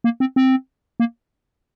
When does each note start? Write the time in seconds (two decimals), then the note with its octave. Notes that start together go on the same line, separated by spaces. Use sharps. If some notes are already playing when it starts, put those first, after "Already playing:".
0.04 A#3
0.20 C4
0.36 C4
1.00 A#3